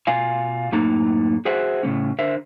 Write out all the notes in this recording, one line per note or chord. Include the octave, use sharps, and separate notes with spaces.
B2 F4 F5 G#5
F#2 A2 A#3 D#4 A4 A#5
F#4 G#4 C5 E5 F#5
A2 C#3 A#3 C#4
D3 A#4 C5 E5